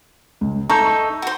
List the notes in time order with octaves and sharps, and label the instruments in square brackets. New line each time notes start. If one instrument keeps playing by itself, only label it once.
[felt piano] C#2
[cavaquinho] D#4 A4 E5 [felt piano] C#6 G6
[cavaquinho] F#4 C5